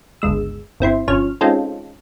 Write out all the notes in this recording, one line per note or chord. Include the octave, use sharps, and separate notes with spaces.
G1 C#2 G#3 E6
G1 C4 E4 C6
G1 F3 C#4 C#5 F6
G#3 C4 C#4 D#4 F4 A4